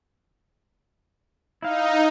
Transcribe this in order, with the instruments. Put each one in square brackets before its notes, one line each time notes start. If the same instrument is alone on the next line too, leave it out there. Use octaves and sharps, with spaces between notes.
[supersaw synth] D#4 [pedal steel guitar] E4 F5